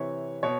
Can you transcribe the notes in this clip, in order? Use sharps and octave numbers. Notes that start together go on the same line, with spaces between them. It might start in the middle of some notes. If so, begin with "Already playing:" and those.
Already playing: C3 E3 C#5
B2 C#5